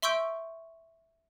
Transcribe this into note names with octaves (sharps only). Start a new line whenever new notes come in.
E5 C6 C#6 E6 G6 D7